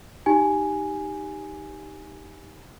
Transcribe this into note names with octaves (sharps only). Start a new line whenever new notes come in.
D#4 G4 G#5